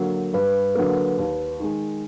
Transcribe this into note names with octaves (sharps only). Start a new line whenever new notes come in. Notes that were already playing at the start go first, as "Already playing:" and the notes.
Already playing: D3 F#3 A#3
G2 B4
D3 F#3 A#3
D#2
D#3 G#3